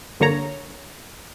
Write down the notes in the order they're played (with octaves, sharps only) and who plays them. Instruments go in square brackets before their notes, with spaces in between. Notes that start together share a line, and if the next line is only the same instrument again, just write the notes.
[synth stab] G2 D3 A#3 C#5 A#5